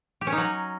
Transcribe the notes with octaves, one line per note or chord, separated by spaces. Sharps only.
G4
C#4
D#4
F#3